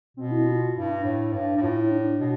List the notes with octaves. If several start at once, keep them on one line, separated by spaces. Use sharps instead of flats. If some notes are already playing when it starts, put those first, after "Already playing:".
B2 C4
E4
F4
G2 E4
D4
A2
G2
G2
A2 F4
E4
D4
B2